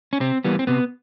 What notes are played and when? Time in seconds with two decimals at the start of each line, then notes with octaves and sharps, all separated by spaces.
0.13 C#4
0.20 C3 C4
0.44 E3 G3 A#3 B3
0.59 C4
0.67 C3 B3